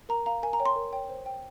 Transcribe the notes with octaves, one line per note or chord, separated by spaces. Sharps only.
A#4 A#5
F5 A#5
A#4 G#5
A#5
C#5 G5
C6
A#4
C#5 G5
C5
G5